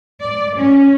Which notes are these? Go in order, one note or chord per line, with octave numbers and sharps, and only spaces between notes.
D5
C#4